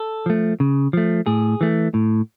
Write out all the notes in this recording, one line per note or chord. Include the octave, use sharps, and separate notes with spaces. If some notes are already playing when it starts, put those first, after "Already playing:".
Already playing: A4
F3 A3
C#3
F3 A3
A2 G#4
E3 A3
A2